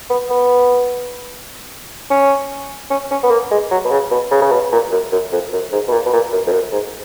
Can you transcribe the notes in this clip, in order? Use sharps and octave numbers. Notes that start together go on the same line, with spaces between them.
B3
B3
C#4
C#4
C#4
B3
A#3
G#3
F#3
B2
C#3
B2
C#3
C#3
B2
A#2
F#2
F#2
F2
F#2
G#2
B2
A#2
B2
A#2
F#2
F2
F#2
G#2